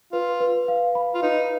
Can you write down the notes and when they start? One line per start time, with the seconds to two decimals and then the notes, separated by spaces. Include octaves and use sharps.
0.12 F4 B4
0.40 B4
0.68 F5
0.95 B5
1.14 F4
1.22 D#4 B4